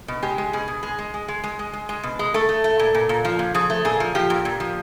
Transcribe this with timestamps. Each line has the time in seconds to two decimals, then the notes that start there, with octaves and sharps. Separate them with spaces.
0.08 B2
0.22 G#3 G4
0.38 G#3
0.53 B2 G#4
0.68 B2
0.83 G#3 G#4
0.99 G#3
1.14 G#3
1.28 G#3
1.44 G#3
1.59 G#3
1.73 G#3
1.89 G#3
2.03 B2
2.19 G#3
2.34 A3 A4
2.49 A3
2.64 A3
2.79 A#2
2.95 A#2
3.09 A#2
3.25 F3
3.39 A#2
3.54 F3 G#4
3.70 A3
3.85 A#2 G#4
4.00 F3
4.15 F3 G4
4.30 A#2
4.45 A#2
4.60 F3